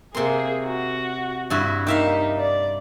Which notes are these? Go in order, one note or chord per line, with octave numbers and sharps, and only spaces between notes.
C3 A#3 G#4 C6
F#4
G2 E4 F#4
A#3 D#4 G4 E5 F5
D5